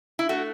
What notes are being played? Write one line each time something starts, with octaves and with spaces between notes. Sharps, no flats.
E4
A3 F#4